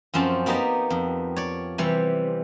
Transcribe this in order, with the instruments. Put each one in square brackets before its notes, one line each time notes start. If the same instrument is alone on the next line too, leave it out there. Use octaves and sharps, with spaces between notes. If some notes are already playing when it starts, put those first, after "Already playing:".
[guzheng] F#2 F3 C4 C#4 A5
A#3 B3 D#4 G4 D5 A#5
F2
C#5 D5
C3 E3 G3